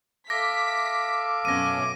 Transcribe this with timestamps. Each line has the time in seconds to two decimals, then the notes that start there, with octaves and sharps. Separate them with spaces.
0.30 A4 E5 F5 D6 A#6 B6
1.45 F#2 B2 C#4 A#6 D#7